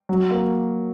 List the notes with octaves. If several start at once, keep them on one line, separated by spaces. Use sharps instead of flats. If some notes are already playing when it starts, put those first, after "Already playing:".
F#3
A#3